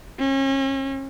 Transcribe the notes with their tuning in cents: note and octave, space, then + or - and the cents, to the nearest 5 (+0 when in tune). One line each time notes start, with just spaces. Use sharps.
C#4 -35